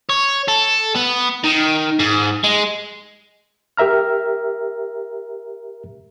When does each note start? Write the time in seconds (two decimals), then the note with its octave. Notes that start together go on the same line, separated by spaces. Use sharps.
0.09 C#5
0.48 A4
0.95 B3
1.44 D#3
2.00 G#2
2.44 G#3
3.77 G4 A#4 E5 A#5 F6